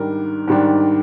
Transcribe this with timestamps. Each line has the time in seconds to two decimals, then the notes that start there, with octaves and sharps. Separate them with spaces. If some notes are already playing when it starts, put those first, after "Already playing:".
Already playing: G#2 D#3 G3 D4 A#4
0.47 G#2 D#3 G3 D4